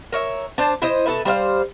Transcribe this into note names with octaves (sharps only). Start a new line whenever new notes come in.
A#4 C#5 E5
D4 C5 A5
E4 C5 D#5
B2 A4 B4 E5
G3 C5 E5 F5